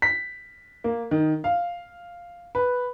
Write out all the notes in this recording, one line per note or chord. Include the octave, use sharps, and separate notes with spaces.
B6
A#3
D#3
F5
B4